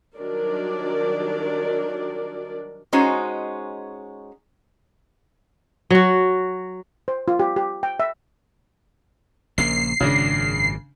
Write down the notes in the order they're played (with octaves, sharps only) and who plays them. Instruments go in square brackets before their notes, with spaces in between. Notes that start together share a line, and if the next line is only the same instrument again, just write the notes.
[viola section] D#3 F#3 G3 D4 A#4 D5
[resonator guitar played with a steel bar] G#3 C#4 D#4 F#4 C5
[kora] F#3 F#4
[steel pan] C5
F4
G4
G4
G5
E5
[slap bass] A#1 C#3 A#3 [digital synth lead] C7
[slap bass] G#1 F#2 A#2 [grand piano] C#3 D4